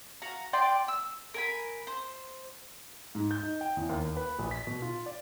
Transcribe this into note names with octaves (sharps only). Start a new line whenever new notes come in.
F#4 F5 A#5
D4 D5 G5 C6
E6
A#4 G#5 B5
C5
G#2
G6
D#4
G5
E2
D#2
B4
A#1
B6
B2
F4
D5